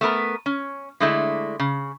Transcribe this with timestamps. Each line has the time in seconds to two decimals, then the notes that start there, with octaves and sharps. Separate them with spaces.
0.01 A3 B3 A#4 B4
0.46 C#4
1.00 D3 G#3 A3 D4 E4
1.59 C#3